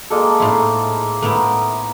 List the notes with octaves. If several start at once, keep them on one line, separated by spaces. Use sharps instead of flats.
G#3 A#3 A4
A2 D#4 E4 C5
A2 B3 E4 A#4